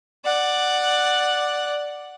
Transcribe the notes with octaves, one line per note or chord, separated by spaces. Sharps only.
D5 F#5